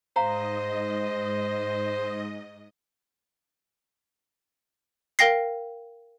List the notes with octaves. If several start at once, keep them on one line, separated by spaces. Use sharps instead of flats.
G#2 C5 D#5 F5 A#5
A#4 F5 G5 A#6 C7